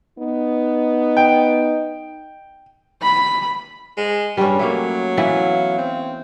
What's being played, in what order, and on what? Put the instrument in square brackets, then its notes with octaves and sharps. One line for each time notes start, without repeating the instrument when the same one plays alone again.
[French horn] B3 [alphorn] D#4
[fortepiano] G5
[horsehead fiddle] B5
[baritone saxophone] G#3
[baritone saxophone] G2 [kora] G3 C#4
[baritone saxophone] F#3 [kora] A3 A#3
[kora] E3 B3 E4 [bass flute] F5
[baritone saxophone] C4